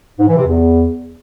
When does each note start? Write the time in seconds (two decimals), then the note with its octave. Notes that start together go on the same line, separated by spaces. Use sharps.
0.19 G#2
0.28 E3
0.37 C3
0.46 E2